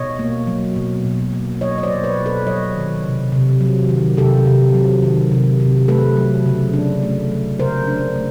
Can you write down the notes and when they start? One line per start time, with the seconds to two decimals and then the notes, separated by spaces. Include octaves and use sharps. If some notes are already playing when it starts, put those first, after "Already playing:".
Already playing: B2 C#5 D#5
0.19 A#3
0.47 F#3
0.76 B2
1.05 B2
1.33 A#3
1.61 F#3 C#5 D#5
1.78 D#5
1.83 C5 D5
1.90 B2
2.04 B4 C#5
2.18 B2
2.26 A4 B4
2.47 F#3 C#5 D#5
2.76 D#3
3.03 C3
3.32 C3
3.61 F#3
3.89 D#3
4.17 C3 G4 A4
4.46 C3
4.74 F#3
5.03 D#3
5.32 C3
5.60 C3
5.88 A3 A4 B4
6.17 F#3
6.46 C#3
6.74 D4
7.03 A3
7.31 F#3
7.59 C#3 A#4 C5
7.88 D4
8.16 A3